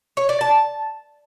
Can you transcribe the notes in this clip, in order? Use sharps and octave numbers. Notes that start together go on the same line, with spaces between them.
C#5
D5
A5